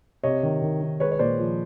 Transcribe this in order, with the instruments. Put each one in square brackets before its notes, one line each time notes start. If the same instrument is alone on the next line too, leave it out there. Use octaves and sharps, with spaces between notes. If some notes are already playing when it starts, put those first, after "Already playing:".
[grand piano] C3 C#5 D#5
D#3
D#3
D#3
G#3 B4 C#5
C#5
A#2 C5 D5
F3